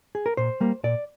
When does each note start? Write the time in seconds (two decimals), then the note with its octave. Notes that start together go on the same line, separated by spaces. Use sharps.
0.15 G#4
0.26 A#4
0.37 A#2 C5
0.61 G3 A#3
0.84 A#2 D5